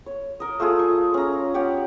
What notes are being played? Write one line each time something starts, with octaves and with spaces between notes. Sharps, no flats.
C#5
A#4 D#5
A3 F4 G#4
C#6
C#4 A#5
G4 C#5 F#5